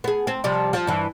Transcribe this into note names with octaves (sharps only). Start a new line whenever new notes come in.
B3 G#4
C4
C3 F3 G3
F3
G2 E3